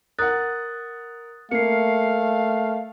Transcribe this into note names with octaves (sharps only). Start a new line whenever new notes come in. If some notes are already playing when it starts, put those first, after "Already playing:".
A#4 F#5 D#6 F#6 A6
A3 A#3 F5 C7 C#7